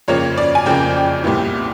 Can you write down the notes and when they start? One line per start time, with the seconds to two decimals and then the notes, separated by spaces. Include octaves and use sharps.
0.08 F2 C#3 F3 A#3 C#5
0.38 D5
0.55 G#5
0.66 F2 C#3 F3 A#3 G5
1.24 C2 A#2 G3 B3 E4